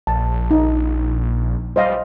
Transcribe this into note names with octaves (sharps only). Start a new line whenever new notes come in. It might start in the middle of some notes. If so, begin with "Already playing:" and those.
A#1 A5
D#4
G3 C5 D#5 F5